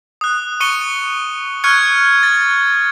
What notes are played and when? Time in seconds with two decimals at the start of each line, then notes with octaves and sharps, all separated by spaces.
0.21 D#6 F#6
0.60 C#6 C#7 D#7 G7
1.64 C#6 F6 F#6 G#6 C#7
2.23 A6